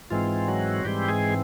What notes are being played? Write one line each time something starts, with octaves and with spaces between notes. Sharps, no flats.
G#2 E3 G#3 C4 F4
F#3 F#4
G#2 E3 G3 G#3 C4 G4
G#3 G#4